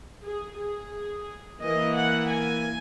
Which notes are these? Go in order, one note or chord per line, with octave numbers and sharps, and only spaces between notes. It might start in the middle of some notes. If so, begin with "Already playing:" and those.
G#4
G#4
E3 A#3 E4 D#5
F#5
G#5